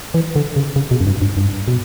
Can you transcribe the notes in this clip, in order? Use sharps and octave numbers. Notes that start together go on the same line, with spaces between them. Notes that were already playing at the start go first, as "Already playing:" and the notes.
E3
D3
C#3
C#3
B2
F#2
G2
G2
G2
B2